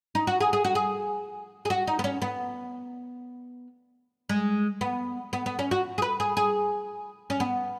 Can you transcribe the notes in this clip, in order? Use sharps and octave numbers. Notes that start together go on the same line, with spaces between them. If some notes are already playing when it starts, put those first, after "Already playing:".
D#4
F#4
G#4
G#4
F#4
G#4
G#4
F#4
D#4
B3
C#4
B3
G#3
B3
B3
B3
C#4
F#4
G#4
B4
G#4
G#4
C#4
B3